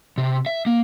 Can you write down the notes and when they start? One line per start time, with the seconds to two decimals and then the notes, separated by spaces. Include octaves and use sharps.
0.18 C3
0.46 E5
0.66 A#3